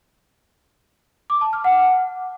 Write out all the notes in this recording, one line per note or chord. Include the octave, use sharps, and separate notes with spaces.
D6
A5
F6
F#5